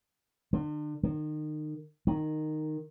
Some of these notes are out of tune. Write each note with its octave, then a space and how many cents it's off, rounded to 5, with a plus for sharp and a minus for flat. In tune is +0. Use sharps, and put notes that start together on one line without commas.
D3 +40
D#3 -30
D#3 -10